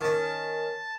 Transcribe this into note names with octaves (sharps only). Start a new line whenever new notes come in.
D#3 C#4 A5